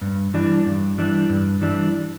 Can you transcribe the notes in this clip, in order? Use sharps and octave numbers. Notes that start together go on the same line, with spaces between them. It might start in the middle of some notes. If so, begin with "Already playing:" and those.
G2
E3 G3 D4
G2
E3 G3 D4
G2
E3 G3 D4